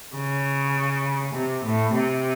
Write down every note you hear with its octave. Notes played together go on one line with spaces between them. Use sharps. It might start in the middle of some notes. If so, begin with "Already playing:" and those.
C#3
C3
A2
C3